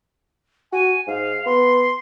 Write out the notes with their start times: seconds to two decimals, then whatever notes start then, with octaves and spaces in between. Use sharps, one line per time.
0.72 F#4 G#5
1.07 G#2 F5
1.46 B3 C6